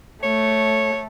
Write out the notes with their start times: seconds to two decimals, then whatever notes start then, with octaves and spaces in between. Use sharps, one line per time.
0.23 A3 C#5